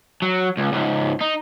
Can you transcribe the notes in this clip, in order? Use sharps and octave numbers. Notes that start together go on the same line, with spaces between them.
F#3
C#2
C#2 G#2
D#4